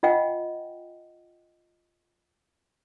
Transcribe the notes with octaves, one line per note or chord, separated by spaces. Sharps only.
F4 D#5 F#5 G5